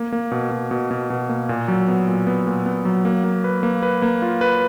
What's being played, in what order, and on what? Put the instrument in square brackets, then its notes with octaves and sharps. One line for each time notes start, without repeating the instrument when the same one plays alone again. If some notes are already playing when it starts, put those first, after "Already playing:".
Already playing: [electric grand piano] A#3
A#3
B2
B2
B2
B2
B2
A#3
A#2
F#3
B3
A#2
B3
A#2
B3
F#3
A#3
A#3
B4
A#3
B4
A#3
F4
B4